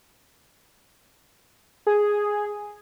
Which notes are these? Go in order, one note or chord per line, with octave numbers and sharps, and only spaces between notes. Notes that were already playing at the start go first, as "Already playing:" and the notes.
G#4